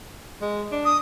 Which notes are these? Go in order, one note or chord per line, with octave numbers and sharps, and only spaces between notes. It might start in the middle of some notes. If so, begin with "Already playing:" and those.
G#3
D4
D#6